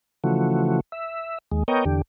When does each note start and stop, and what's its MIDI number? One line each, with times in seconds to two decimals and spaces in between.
0.24 0.80 49
0.24 0.80 52
0.24 0.80 53
0.24 0.80 57
0.24 0.80 66
0.92 1.38 76
1.52 1.63 39
1.52 1.63 56
1.68 1.85 59
1.68 1.85 70
1.68 1.85 73
1.68 1.85 75
1.68 1.85 79
1.85 2.02 40
1.85 2.02 50
1.85 2.02 67